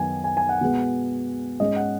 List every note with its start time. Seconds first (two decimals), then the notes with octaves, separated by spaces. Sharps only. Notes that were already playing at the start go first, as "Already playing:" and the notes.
Already playing: F#2 D#3 F#3 B3 G#5
0.24 G#5
0.37 G#5
0.49 F#5
0.61 B2 G#3 B3
1.60 G#2 G#3 C#4 D#5
1.76 F#5